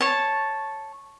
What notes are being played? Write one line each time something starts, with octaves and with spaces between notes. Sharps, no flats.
C#5 A5